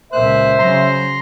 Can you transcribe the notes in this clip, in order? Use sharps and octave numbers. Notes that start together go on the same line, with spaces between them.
C#2 A#2 C5 E5 F#6
C#3 F#3 A#5 C6